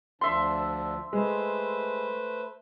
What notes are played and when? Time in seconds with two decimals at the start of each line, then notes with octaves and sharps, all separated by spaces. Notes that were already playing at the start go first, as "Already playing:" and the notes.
0.21 D2 F3 D4 E5 C6
1.13 G#3 A3 B4 C5